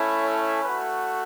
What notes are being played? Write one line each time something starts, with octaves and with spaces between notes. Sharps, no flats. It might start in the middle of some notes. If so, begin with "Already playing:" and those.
Already playing: A3 C#4 E4
A4 C#5
A3 F#4 B4